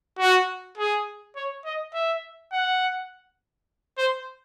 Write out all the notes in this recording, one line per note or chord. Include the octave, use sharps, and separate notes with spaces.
F#4
G#4
C#5
D#5
E5
F#5
C5